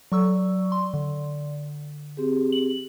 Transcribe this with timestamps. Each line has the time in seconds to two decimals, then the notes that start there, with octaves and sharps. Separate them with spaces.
0.12 F#3 A4 D5 C#6 E6
0.25 D5
0.72 C6
0.94 D3
2.17 C4 G4 G#4
2.52 F#7